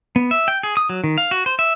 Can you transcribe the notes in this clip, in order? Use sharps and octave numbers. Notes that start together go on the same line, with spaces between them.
B3
E5
G5
G#4
D#6
F#3
D#3
F5
F#4
C5
E5